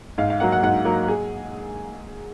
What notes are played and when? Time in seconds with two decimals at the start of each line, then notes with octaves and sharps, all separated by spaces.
0.18 G#2 F5
0.30 F5
0.40 F#3 A#3 F#5
0.52 F#5
0.63 G#2 F#5
0.85 F#3 A#3
1.08 G#4